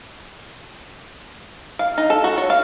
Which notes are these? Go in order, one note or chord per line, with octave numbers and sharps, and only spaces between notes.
F5
D#4
A4
F#4
C#5
F5